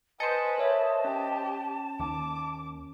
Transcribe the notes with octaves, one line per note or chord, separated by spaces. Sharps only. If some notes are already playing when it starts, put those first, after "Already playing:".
B4 C5 D#5 G#5 A5 A6 C#7
A#4 C#5 E5
C#4 G4
D#2 D6